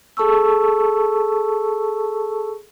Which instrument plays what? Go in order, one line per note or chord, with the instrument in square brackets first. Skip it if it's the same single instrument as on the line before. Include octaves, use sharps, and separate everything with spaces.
[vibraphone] G#4 A4 A5 C#6 E6